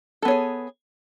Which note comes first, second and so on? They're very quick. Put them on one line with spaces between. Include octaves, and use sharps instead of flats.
A4 B3 C#5 G#4